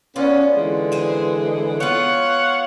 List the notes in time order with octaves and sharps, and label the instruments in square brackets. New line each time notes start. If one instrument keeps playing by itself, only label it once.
[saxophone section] B3 C#4 [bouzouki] F4 D5
[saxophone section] D3 E3 G#3
[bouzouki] G#4 C5
[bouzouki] B3 F4 [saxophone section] C#5 F5 F#5